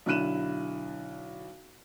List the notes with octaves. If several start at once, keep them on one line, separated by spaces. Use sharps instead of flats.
B1 D3 E4 F#6 D#7 E7